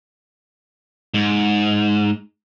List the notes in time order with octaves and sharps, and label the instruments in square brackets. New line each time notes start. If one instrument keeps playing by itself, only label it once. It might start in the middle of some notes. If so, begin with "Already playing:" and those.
[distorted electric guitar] G#2